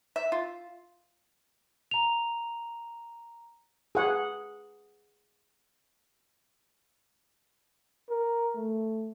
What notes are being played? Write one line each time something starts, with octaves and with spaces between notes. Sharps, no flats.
E5
F4
A#5 F7
G#4 F#5
A#4
A3